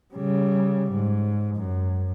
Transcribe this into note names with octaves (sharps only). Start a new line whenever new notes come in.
C#3 G3
G#2
F#2